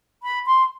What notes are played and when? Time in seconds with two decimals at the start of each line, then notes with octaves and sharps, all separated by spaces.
0.23 B5
0.46 C6